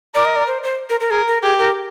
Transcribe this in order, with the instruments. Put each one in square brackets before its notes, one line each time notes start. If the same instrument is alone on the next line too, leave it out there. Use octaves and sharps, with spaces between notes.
[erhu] A#4 [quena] D5
[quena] D#5
D5
C5
C5
A#4
A#4
[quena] G#4 [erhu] A#4
[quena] A#4
[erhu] G4 [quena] G#4
[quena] A#4